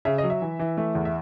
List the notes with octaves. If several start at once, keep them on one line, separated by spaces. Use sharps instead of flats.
C#3 E5
D#5
F#3
E5
E3
E3
A3
E2
E5